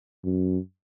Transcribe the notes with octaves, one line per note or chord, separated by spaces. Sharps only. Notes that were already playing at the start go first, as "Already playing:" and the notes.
F#2